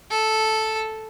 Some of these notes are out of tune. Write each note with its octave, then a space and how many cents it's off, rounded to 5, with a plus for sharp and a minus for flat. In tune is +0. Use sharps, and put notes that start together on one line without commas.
A4 -5